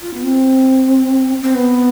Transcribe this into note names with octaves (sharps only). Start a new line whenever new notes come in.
F4
B3
C4
C4
B3